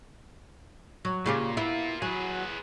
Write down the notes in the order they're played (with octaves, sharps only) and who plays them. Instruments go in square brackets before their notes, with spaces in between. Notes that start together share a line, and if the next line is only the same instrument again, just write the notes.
[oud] F#3
[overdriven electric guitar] A#2 [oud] C#3 F4 G4
[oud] B3 E4 [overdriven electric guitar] F4 A#4
[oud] F#3 [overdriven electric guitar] G#4 B4